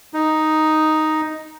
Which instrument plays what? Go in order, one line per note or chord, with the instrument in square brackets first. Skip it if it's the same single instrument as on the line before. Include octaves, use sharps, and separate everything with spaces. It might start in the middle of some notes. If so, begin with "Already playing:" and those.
[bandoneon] D#4